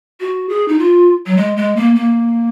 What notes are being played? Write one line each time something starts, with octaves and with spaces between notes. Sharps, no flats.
F#4
G#4
D#4
F4
F#3
G#3
G#3
A#3
A#3